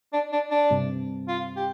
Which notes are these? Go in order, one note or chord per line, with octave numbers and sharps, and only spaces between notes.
D4
D4
D4
G2 C3
F4
G4